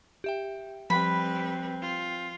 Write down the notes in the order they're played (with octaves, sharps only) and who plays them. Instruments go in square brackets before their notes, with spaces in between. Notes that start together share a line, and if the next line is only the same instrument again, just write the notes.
[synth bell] G4 E5 G5
[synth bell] F3 [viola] G3 B4 [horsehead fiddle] C4 [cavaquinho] B5
[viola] F4